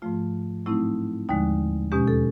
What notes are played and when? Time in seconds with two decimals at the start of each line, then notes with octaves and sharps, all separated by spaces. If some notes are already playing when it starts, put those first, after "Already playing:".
0.02 G#2 F3 A3 F4
0.66 A2 F#3 A3 C4 D#4 E4
1.29 D#2 D3 F3 G#3 D#4
1.91 E2 B2 G#3 C#4 G4
2.08 A4